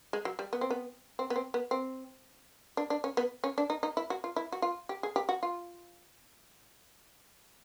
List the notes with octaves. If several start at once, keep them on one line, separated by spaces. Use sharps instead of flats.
G#3
F#3
G3
B3
C4
B3
C4
B3
C4
B3
C4
D4
D4
C#4
B3
C#4
D4
D#4
D#4
E4
F#4
F4
E4
F#4
F4
G4
G#4
G4
F#4
F4